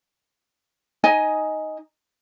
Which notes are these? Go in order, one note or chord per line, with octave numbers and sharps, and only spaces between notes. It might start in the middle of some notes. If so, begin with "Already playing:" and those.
D#4 D#5 G#5